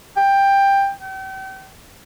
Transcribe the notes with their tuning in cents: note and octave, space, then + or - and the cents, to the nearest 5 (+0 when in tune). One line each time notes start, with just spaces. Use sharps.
G5 +15
G5 -40